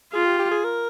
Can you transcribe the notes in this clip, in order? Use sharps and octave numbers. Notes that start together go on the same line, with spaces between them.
F4 G#4
G4
G4
G#4
A#4